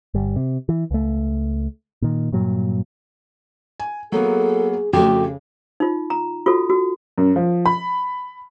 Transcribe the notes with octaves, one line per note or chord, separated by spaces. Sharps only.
G1 G3
C3
E3
C#2 A3
A#2 D#3
G2 A#2 F#3
G#5
F#3 A#3 B3 G#4 A4
F2 C#3 A3 F#4 G4
D#4 F4
A#5
F4 F#4 A4
F#4
F#2
F3
B5